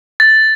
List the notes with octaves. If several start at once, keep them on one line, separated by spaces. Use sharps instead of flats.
A6